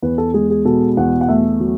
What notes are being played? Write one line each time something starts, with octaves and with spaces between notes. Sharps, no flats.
E2 B4
A4
G#3 G#4
G#4
B2 A4
E2 F#5
F#5
A3 E5
F#3